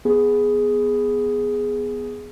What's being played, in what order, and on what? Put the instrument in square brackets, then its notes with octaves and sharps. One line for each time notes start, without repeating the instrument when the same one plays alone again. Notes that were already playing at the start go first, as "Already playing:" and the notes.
[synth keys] B3 G#4